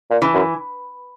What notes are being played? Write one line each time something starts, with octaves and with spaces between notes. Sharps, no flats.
A#2
E3
F#2